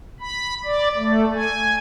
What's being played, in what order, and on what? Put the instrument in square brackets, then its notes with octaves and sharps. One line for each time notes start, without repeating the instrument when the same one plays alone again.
[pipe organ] B5
D5
A3
G#5